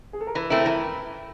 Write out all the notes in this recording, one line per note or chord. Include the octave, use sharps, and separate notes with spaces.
G#4
A4
A#4
E3 B4
A3 C4 E4 A#4
A4
E3 A#4